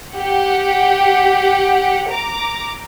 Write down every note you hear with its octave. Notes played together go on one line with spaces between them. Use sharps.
G4 F#5
A#5 D6